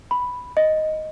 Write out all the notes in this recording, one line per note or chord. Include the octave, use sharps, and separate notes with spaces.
B5
D#5